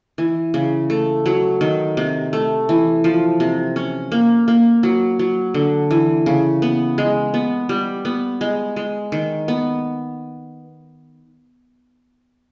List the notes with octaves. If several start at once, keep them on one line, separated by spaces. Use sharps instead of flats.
E3
C#3
A3
F#3
D#3
C3
A3
E3
F3
C3
C#4
A#3
A#3
F#3
F#3
D3
E3
C#3
B3
G#3
B3
G3
B3
G#3
G#3
D#3
B3